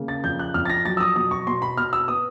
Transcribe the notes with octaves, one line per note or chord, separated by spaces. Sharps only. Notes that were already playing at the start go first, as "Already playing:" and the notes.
Already playing: C#3 A#3
A6
F2 G6
F#6
F2 F6
A6
A#6
F#3 A6
E6
D#6
B2 D#6
C#6
B2 C6
B5
B2 F6
E6
B3 D#6